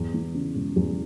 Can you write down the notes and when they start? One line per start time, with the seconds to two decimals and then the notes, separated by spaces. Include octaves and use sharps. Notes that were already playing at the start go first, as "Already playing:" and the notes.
Already playing: E2
0.14 E3
0.34 C#3
0.55 E1
0.76 E2